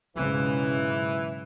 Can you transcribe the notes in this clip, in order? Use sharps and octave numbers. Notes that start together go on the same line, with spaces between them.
B1 G#2 C#3 E3